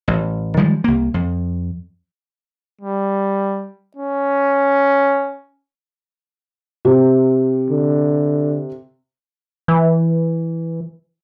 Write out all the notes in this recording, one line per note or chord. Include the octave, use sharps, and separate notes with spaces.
A1
D#3 F3 G3 G#3
C2 A#3
F2
G3
C#4
C3
D3
E3